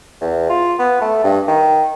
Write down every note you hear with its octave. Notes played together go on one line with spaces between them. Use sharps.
E2
F4
B3
A3
G2
D#3